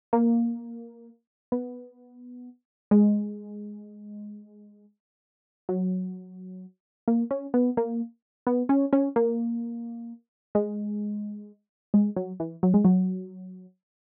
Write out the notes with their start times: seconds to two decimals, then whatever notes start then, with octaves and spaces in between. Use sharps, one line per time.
0.13 A#3
1.52 B3
2.91 G#3
5.69 F#3
7.08 A#3
7.31 C#4
7.54 B3
7.77 A#3
8.47 B3
8.69 C#4
8.93 C#4
9.16 A#3
10.55 G#3
11.94 G#3
12.16 F#3
12.40 E3
12.63 F#3
12.74 G#3
12.85 F#3